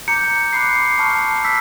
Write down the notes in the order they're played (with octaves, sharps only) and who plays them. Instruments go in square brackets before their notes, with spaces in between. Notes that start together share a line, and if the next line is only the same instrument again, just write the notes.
[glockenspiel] A#5 D6 G6 C#7
B5 D6 F#6 C7
A5 C#6 F6
E6 B6